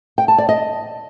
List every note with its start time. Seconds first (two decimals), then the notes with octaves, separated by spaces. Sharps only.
0.18 G5
0.28 A5
0.38 D5
0.49 D#5